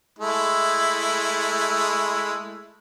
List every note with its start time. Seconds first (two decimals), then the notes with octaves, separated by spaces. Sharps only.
0.19 G#3 A3 E4